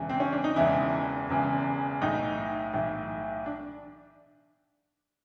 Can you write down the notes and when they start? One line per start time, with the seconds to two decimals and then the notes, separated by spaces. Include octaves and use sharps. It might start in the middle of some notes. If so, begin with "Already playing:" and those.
Already playing: E1 E2 C#3 E3
0.09 C4
0.20 C#4
0.33 D4
0.44 D#4
0.56 E1 E2 C#3 E3 E4
1.29 E1 E2 C#3 E3
2.02 B1 A2 E3 D#4
2.74 B1 A2 E3
3.46 D4